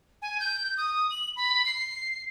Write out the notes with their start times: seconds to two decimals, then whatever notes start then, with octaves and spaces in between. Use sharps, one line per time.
0.22 G#5
0.40 G6
0.77 D#6
1.11 F#7
1.36 B5
1.66 C7